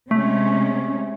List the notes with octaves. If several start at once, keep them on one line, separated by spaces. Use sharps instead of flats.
C3 G#3 A3 C#4